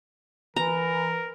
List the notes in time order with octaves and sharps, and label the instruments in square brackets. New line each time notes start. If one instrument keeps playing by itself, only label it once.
[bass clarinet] E3 [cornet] A#4 [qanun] A#5